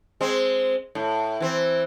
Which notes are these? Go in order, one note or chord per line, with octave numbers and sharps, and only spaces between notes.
G#3 C4
A2
E3 C4